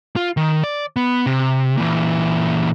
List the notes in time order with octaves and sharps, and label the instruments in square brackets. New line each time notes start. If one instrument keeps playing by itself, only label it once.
[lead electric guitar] F4
D#3
D5
B3
C3
A#2 E3